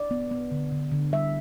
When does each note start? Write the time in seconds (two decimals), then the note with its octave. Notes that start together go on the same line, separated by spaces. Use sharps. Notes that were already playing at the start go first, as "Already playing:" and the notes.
Already playing: D5
0.11 B3
0.31 B3
0.52 D3
0.72 D3
0.92 D3
1.12 G3 E5